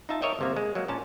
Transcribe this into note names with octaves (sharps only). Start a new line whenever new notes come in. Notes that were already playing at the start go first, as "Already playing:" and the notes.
D#4 F4 E5 A5
A#4 C#5 D#5 E5 G5
G1 C3 A#3
G#3
F#3 A#3
A#2 C#4 A5